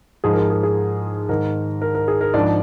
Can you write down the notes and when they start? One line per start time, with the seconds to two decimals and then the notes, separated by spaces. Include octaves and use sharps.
0.24 G#2 F3 G#4
0.33 A#4
0.37 G#4
0.50 G#4
0.63 G#4
1.29 G#2 D#3 A#4
1.82 A#4
1.95 A#4
2.08 G#4
2.21 A#4
2.34 G#2 F3 D4 D5